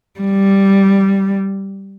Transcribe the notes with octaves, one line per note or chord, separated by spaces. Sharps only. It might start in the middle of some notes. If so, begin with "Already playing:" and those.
G3